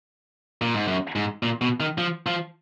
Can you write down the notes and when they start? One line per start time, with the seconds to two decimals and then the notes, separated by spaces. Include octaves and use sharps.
0.62 A#2
0.74 G#2
0.87 F#2
1.16 G#2
1.43 A#2
1.61 B2
1.80 D#3
1.98 F3
2.27 F3